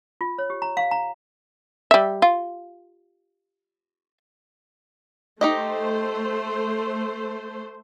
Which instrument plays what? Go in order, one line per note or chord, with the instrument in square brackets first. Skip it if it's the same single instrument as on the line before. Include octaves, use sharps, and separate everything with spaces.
[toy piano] F4
C#5
G4
A#5
F5
A#5
[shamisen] G3 E5
F4
[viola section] A3 C5 [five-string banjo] D#4 G4 D#5